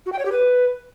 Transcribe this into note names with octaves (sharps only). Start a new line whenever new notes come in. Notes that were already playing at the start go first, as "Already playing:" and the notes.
F#4
G5
C#5
G4
B4